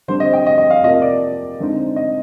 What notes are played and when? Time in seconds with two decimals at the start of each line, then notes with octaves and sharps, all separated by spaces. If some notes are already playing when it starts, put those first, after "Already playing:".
0.08 D3 G3 C4 C5
0.20 D#5
0.33 G5
0.46 D#5
0.58 D#5
0.70 F5
0.83 C3 F3 A#3 D#5
1.02 D5
1.60 D3 G#3 C4 D#4
1.96 D#5